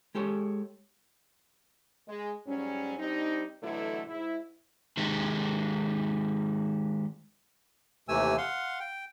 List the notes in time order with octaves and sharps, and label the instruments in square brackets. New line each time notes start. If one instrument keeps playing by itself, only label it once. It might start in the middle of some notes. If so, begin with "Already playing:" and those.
[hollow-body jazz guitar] G#3 G4 A4 C#5
[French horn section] G#3
G#2 F#3 G3 C#4
G3 C4 D4 D#4
B2 D3 E3 F#3 A3 E4
G#2 E4
[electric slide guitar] D#3 G#3 D#4 G4
[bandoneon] D#2 C3 E3 A3 G#5 E6
F5 F#5 C6
G5